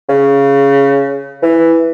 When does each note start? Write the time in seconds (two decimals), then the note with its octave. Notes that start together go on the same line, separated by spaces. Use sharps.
0.09 C#3
1.42 E3